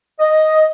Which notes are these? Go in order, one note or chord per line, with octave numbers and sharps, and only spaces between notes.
D#5